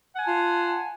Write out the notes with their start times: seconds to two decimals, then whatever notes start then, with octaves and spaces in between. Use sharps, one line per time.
0.14 F#5
0.18 G#5
0.22 A5
0.27 F4